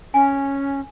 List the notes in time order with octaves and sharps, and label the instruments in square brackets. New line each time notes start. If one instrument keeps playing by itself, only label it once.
[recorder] C#4 [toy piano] G#5